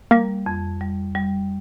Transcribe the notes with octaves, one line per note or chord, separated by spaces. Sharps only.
G3 A#3
F2
G3
G3